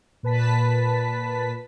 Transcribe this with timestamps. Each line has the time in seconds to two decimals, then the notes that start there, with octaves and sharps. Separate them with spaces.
0.23 A#2 B4 A5 B6